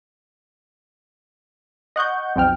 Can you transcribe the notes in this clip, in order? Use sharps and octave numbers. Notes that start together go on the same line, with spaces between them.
D#5 F#5 C#6 G6
B1 F2 G5 F6